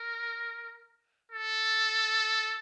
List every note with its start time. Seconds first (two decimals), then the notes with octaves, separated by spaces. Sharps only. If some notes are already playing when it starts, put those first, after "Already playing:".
Already playing: A#4
1.32 A4